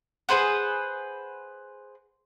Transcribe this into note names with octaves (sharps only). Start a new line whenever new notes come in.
G#4 B4 C5 F#5